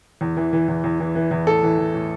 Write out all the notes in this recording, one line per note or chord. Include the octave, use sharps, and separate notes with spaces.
E2
E3
E3
E2
E2
E3
E3
E2
A2 A4
E3
E3
A2